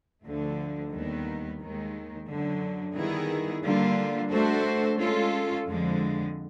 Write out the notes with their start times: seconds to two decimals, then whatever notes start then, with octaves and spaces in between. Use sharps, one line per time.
0.24 D2 D3 F3 A3
0.92 D#2 D#3 G3 B3
1.60 D#2 D#3 G#3
2.27 F#2 D3 F#3
2.95 D#3 G3 B3 E4 G#4
3.63 D3 G3 A#3 D4 F4
4.30 A3 D4 F#4 A4 C5
4.98 G#3 C#4 F4 A4
5.65 F2 D3 F3 G#3